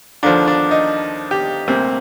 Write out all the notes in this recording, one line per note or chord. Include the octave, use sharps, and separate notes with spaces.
D#2 D3 F3 D4
D4
D#4
G4
D2 C3 G3 A#3 C4